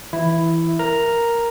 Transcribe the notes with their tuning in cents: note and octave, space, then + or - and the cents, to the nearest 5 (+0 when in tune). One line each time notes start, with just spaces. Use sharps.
E3 +0 E4 +5
A#4 +0 A#5 +0